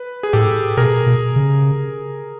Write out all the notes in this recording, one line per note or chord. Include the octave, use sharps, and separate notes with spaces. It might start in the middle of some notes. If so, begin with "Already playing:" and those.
Already playing: B4
G#4
A2 G4 A4
B2 G#4 A#4
B2
C#3